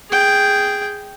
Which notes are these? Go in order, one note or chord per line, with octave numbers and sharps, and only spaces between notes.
G#4 G5